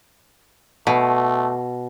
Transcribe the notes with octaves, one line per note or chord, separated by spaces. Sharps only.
B2 A3